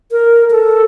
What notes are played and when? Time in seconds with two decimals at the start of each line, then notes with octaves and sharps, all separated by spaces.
0.11 A#4
0.51 A4